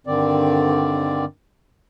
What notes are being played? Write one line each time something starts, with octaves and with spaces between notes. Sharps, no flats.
G2 D3 D#3 C4 D5